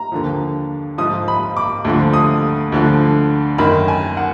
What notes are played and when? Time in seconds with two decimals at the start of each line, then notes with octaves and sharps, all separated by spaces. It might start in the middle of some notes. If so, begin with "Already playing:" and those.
Already playing: A#5
0.12 D#2 D3 F3
0.98 G#2 F3 D#6
1.28 B5
1.57 D6
1.85 D2 D3 F3
2.13 D#6
2.72 D2 D3 F3
3.58 F#2 D#3 B5
3.88 G#5
4.17 F#5